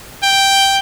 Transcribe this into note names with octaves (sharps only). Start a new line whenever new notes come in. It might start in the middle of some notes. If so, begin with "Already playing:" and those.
G5